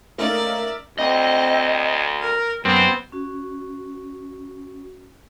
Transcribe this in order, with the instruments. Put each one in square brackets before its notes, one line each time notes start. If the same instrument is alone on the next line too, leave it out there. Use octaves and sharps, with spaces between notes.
[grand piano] A3 [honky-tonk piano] A#3 C#4 D#4 [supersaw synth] A#4 E5 [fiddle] D5
[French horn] D2 [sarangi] C4 [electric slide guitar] D#5
[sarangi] A#4
[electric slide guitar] F#2 [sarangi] B3 [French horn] C4
[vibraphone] C#4 F#4